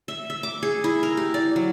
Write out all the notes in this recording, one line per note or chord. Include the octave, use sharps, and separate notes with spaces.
E5
E5
D6
G#4
E4
A#4
G4
D5
F#3